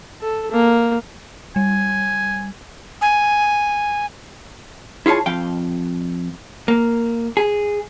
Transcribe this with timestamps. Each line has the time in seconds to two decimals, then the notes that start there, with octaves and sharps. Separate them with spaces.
0.21 A4
0.52 A#3
1.56 G3 G#5
3.02 G#5
5.06 E4 F4 G#4 C#5 A5
5.26 F2 F5 G5
6.68 A#3
7.37 G#4